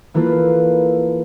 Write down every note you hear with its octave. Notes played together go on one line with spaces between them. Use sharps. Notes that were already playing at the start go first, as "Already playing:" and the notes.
E3 A#3 E4 F4 A4 B4